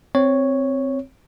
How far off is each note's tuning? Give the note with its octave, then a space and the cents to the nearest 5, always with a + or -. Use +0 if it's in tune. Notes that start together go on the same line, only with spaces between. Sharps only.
C4 +0 C#5 +0